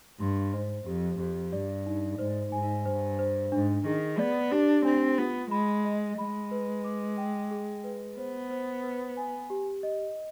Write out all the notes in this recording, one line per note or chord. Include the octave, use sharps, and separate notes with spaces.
G2 C6
G#2 C5
F2 G4
F2 G4
G2 D5
D#4
G#2 C5
G#2 G#5
G2 C5
C5
G#2 D4
D#3 G#4
B3 D5
D4 G4
C4 D4
B3 F4
G#3 B5
D#5
G#3 B5
B4
D6
G5
G#4
B4
B3 C5
C5
B4
G#5
G4
D#5